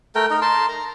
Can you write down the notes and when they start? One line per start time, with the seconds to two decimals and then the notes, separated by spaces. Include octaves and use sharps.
0.15 A3 A#4 G5
0.30 D#4 A#4
0.42 A#4 A5 C6
0.69 A#5